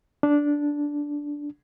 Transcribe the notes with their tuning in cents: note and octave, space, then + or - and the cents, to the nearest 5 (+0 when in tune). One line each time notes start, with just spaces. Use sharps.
D4 -10